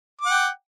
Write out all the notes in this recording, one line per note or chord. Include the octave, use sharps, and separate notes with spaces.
F#5 G5 D6